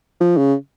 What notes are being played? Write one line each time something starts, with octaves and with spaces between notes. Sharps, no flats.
F3
C#3